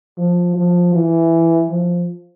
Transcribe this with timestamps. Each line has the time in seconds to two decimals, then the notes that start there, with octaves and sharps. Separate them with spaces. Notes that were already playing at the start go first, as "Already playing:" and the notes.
0.18 F3
0.56 F3
0.94 E3
1.70 F3